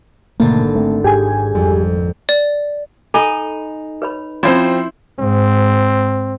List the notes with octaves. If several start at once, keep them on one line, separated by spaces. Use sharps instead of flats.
G#1 B2 D3 A3 A#3 A5
A3 C4
G#2 G4 G#4 G#5
F2 G3
D5
D#4 A4 D#5 G#5 B5
B4 C#5 B5
F3 C4 C#4 E4 C5 C#5 C6
G#2 C4